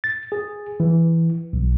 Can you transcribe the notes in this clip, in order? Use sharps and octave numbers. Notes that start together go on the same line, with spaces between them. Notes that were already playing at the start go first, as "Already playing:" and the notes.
A6
G#4
E3
B1